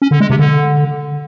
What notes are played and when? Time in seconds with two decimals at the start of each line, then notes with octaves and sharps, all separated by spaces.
0.02 C#4
0.11 D3
0.20 G#3
0.30 C3
0.39 D3